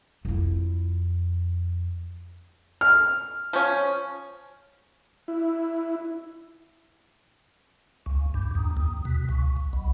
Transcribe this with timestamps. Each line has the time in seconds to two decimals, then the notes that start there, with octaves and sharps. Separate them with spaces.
0.25 F2 E4
2.81 F6
3.53 F3 C#4
5.28 E4
8.06 C#2
8.34 G2
8.55 D#2
8.77 D#2
9.05 B2
9.29 C#2
9.73 B1